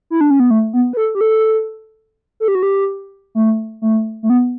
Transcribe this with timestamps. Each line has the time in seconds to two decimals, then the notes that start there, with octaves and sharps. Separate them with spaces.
0.10 E4
0.21 D4
0.30 C#4
0.40 B3
0.50 A3
0.73 B3
0.93 B4
0.97 A4
1.15 G4
1.21 A4
2.40 A4
2.48 G4
2.55 F#4
2.63 G4
3.35 A3
3.82 A3
4.23 A3
4.30 B3